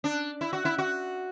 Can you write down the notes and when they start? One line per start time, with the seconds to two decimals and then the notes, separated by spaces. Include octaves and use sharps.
0.04 D4
0.41 E4
0.53 F#4
0.65 E4
0.78 F#4